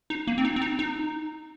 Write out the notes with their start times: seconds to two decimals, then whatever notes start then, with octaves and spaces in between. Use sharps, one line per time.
0.10 D#4
0.27 A#3
0.38 C4
0.45 D#4
0.56 C4
0.62 D#4
0.79 D#4